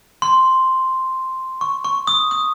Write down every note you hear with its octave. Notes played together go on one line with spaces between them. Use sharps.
C6
C#6
C#6
D#6
D#6